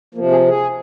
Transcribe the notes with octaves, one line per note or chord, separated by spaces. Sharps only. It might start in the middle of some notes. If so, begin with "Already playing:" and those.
C3 F3 A#3
G#4
G#4